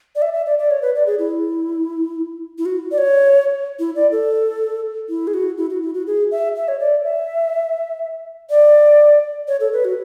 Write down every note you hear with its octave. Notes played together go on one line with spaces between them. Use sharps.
D5
E5
E5
D5
D5
C#5
B4
D5
G#4
E4
E4
F#4
D5
C#5
E4
D5
A4
E4
G#4
F#4
E4
F#4
E4
F#4
G#4
E5
E5
C#5
D5
E5
D5
C#5
A4
B4
F#4